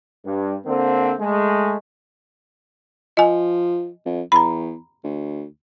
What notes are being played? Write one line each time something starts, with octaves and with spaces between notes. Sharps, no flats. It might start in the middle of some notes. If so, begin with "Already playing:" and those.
G2
D3 A#3 C4
G#3 A3
F3 D#5 G#5
F2
E2 A#5 B5
D2